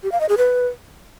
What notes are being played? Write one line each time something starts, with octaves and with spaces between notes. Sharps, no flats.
G4
F5
D#5
G#4
B4